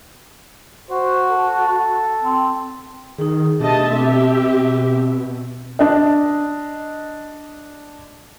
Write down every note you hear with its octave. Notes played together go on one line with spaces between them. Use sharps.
F#4 C5
A4
C4
D#3 D#4 G#4
B2 A3 D4 G4 D#5 E5 A5
C4 G4 E5
D4 D5 D#5